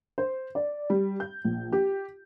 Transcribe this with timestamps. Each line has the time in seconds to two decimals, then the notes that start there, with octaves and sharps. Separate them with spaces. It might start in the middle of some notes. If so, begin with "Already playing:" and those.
0.18 C5
0.55 D5
0.90 G3
1.20 G6
1.44 A#1
1.73 G4